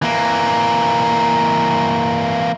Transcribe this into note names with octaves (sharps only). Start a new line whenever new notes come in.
E3 A#3